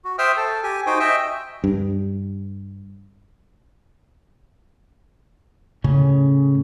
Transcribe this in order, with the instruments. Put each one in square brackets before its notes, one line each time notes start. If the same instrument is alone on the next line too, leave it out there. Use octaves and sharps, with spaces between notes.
[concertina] F#4
C5 E5 G5 D#6 F6
A4
G4 G#5
D#4 F#4 C5 G5 G#5
D#5 E5 G5
[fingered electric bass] G2
A2 C#3 C#4